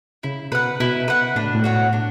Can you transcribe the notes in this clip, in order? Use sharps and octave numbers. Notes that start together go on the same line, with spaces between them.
C#3 E4
B2 B4 F#5
B2 E4
B4 F#5
A2 D4
B2
A2
F#4 C#5 F#5
D4